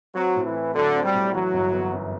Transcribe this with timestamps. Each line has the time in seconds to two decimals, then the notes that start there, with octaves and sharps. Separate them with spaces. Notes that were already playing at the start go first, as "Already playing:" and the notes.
0.15 F#3 C4
0.36 A2
0.45 E3
0.55 E4
0.75 D3 F#3
0.95 C4
1.04 G3
1.14 A2
1.33 E3 F#3
1.54 G1
1.73 B3
1.93 F#2